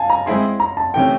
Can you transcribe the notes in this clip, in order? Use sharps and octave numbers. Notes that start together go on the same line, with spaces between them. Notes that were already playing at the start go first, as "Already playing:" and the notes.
Already playing: F5 G#5 A5
A#5
G#3 C4 E4 G#4 C6
A#5
A5
C3 E3 A3 C#4 G5